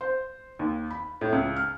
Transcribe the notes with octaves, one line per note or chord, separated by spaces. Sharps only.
C5
D#2
B5
A2
C#2
F6